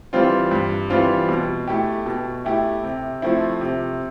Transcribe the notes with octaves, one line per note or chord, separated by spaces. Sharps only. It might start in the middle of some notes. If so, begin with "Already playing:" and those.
E3 G3 C4 F4
G2
E3 G3 C4 F4
B2
A3 E4 G4
B2
A3 E4 G4
C3
F3 A3 C4 E4
C3